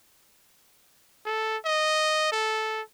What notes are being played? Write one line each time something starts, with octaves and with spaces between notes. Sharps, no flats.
A4
D#5
A4